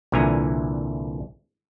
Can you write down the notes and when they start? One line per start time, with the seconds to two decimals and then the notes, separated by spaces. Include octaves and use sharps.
0.12 C2 A#2 D3 E3 G#5 A#5